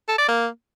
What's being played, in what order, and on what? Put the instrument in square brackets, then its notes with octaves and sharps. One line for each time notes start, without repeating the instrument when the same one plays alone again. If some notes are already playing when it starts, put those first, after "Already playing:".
[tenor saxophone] A4
D5
A#3